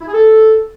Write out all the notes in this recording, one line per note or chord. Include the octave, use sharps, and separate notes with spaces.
E4
G#4
A4